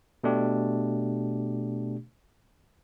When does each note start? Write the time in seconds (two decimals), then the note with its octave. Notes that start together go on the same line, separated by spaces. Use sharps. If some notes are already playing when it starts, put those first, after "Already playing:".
0.24 B2 A3 D4 G4